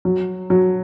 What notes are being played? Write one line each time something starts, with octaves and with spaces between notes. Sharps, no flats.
F#3
F#3